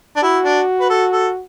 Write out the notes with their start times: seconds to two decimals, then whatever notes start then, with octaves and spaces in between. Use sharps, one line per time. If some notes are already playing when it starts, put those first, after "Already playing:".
0.16 D4
0.23 E4 F#4
0.45 D4
0.81 B4
0.90 A4
1.12 A4